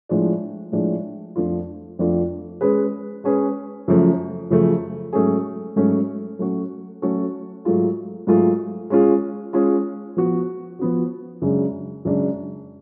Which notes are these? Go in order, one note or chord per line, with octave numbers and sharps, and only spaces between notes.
A2 F3 G#3 D4
A2 F3 G#3 D4
F2 F3 A3 D4 F4
F2 F3 A3 D4 F4
G#3 C#4 G#4 B4
G#3 C#4 G#4 B4
F#2 C#3 F3 A3
F#2 C#3 F3 A3
G#2 F#3 A3 C#4 G#4
G#2 F#3 A3 C#4 G#4
F#3 A3 C#4 F#4 A4
F#3 A3 C#4 F#4 A4
G#2 F#3 A3 F4 G#4
G#2 F#3 A3 F4 G#4
G#3 C#4 F4 G#4
G#3 C#4 F4 G#4
F3 B3 F#4
F3 B3 F#4
F#2 C#3 G#3 D4
F#2 C#3 G#3 D4